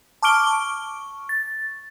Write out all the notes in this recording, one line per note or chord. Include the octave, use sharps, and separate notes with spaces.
A5 C#6 D6 F6 D7 G7
C#6
A6